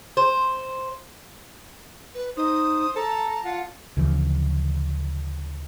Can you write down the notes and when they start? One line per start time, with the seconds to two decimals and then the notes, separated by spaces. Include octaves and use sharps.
0.17 C5
2.15 B4
2.37 D#4 C5 D#6
2.96 A4 A5 A#5
3.45 F4 F#5
3.97 D2 C#3 E3 F3